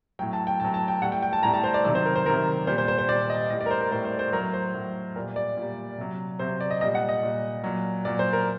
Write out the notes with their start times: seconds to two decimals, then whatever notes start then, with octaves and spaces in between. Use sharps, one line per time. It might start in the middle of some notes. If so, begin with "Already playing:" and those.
0.19 F#3 G5
0.22 A2
0.33 A5
0.47 G5
0.60 A2 F#3 A5
0.74 A5
0.88 G5
1.02 A2 G3 F#5
1.12 G5
1.23 G5
1.33 A5
1.43 A2 G3 A#5
1.54 A5
1.64 C5
1.74 D5
1.85 C3 D#3 F#3 D5
1.95 C5
2.05 A#4
2.15 C5
2.26 C3 D#3 F#3 A#4
2.67 A#2 G3 C5
2.78 C5
2.88 C5
2.98 C5
3.08 A#2 G3 D5
3.30 D#5
3.50 A2 G3 D#5
3.61 D5
3.66 A#4
3.71 C5
3.81 A#4
3.91 A2 G3 C5
4.05 C5
4.19 C5
4.33 F#3 A#4
4.37 A2
4.54 C5
4.74 A2 F#3
5.15 A#2 A#4
5.20 G3
5.36 D5
5.57 A#2 G3
5.98 C3 F#3
6.39 C3 F#3 C5
6.60 D5
6.71 D#5
6.81 A#2 G3 D#5
6.95 F#5
7.09 D#5
7.23 A#2 G3
7.64 A#2 F#3
8.05 A#2 F#3 D5
8.19 C5
8.33 A#4